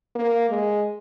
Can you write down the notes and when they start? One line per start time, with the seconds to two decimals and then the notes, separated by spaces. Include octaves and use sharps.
0.15 A#3
0.49 G#3